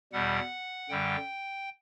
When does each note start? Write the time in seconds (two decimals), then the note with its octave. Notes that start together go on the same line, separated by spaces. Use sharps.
0.13 E2 B2 G3 F#5
0.89 F#2 D3 G3 G5